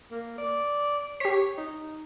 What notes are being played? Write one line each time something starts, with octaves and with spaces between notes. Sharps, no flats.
A#3
D5
G4 C#5 B6
D#4